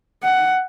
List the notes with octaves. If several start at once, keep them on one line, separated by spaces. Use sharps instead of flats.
F#5